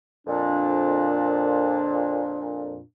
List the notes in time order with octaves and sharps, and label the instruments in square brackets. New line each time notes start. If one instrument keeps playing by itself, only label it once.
[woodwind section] F2 A#2 D4